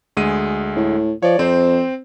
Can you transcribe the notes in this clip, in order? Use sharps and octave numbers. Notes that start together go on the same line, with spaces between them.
D2 G#3 D#7
A2
F3 C#5 D5
F2 C4 C5